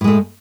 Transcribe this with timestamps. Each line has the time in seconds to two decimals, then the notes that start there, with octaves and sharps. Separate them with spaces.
0.01 A2
0.04 G#3
0.08 A3